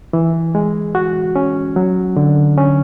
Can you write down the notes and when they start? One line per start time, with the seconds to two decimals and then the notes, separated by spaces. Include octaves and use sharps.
0.13 E3
0.55 G#3
0.95 F#4
1.36 C#4
1.76 F#3
2.16 D3
2.58 C#4